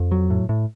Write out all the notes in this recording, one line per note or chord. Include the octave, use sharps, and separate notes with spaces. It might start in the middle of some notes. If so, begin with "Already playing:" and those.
Already playing: F2
F#3
A2
A2